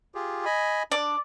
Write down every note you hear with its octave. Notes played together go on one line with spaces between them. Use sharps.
F4 G4 G#4
D#5 G#5 B5
D4 D5